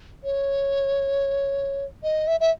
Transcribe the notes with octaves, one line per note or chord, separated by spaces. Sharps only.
C#5
D#5
E5
E5